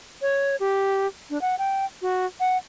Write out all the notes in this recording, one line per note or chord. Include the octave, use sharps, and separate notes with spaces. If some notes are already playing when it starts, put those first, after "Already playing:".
C#5
G4
D4
F#5
G5
F#4
F#5